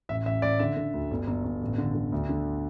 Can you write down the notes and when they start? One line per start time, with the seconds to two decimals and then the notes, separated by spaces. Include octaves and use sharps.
0.09 A1 E5
0.25 A1 E5
0.42 A1 D5
0.60 D3 E5
0.77 D3
0.94 D2
1.11 G1
1.27 G1
1.44 G1
1.61 A1
1.78 D3
1.95 D3
2.12 D2
2.29 D3